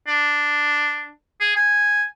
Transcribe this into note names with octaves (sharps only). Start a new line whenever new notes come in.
D4
G#4
G#5